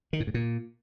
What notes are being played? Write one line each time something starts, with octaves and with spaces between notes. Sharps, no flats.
D#3
A2
G#2
A#2